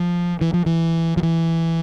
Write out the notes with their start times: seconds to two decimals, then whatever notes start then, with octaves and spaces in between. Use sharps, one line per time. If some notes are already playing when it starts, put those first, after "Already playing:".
Already playing: F3
0.41 E3
0.54 F3
0.66 E3
1.17 F3
1.23 E3